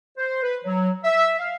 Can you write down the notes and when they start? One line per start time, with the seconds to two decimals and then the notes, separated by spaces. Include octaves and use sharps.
0.17 C5
0.42 B4
0.64 F#3
1.03 E5
1.39 F5